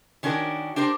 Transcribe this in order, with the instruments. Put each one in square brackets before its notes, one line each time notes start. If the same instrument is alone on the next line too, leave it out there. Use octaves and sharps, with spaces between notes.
[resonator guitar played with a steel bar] D#3 C#4 D4 F#4 A#4
D4 G4 A#4 C5